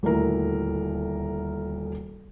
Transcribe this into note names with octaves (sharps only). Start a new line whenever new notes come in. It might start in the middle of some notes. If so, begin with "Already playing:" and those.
D#1 D2 E4 A#4